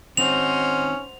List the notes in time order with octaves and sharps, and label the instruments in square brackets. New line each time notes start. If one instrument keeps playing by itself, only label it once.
[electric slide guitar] D#3 C4 D#4 [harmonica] C#4 [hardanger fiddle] F#4 C5 [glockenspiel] F7